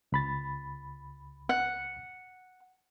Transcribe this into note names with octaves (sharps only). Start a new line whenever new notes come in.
C#2 B5 A6
F#5